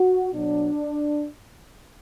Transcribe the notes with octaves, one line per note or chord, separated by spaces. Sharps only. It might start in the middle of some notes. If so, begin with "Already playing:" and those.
Already playing: F#4
B2 F#3 D4